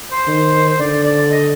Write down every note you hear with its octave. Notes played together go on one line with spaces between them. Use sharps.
C5
D#3
C5
D3 D5
D5
D#5